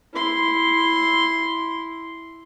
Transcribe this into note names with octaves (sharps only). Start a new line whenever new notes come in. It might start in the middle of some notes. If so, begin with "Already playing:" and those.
E4 C6